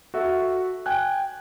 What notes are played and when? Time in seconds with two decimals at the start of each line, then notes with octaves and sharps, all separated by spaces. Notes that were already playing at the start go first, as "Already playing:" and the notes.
0.14 F#4 A4 E5 F#5
0.86 G5 G#5 F#6